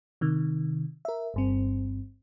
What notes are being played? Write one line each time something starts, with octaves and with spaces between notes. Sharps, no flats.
C3 D#3
A#4 E5
G1 G2 C4